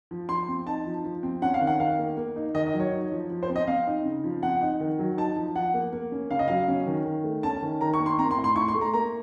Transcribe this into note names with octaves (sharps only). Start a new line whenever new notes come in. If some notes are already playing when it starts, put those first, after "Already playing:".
F3
F3 C6
C4
D#4 A5
F3
F3
C4
C#4 F#5
F5
D#3
F#5
D#3 F5
A#3
A#3
D#4
D#3 D#5
D#5
F#3
C#5
D#4
F3
F3
C5
C4
D#5
C4 F5
D#4
C#3
F3
C4 F#5
D#4
D#3
F#3
D#4 A5
F3
F3 F#5
A#3
A#3
C#4
C#3 F5
D#5
F#3 F5
C#4
D#3
D#3
A3
C#4 A5
D#3
D#3 A#5
C#6
A#3
C6
C4 A#5
C6
A2
C6
A2 C#6
C6
A3
A#5
A#3 A#5